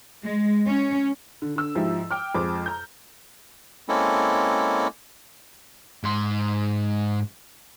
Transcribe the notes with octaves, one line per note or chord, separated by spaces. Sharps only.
G#3
C#4
D3
D3 E6
G#2 F3 E4 G4
G5 D6 F6
F2 G#3 C5 D6
A#5 G6
G#3 A#3 C4 C#4 E4 A4
G#2 C6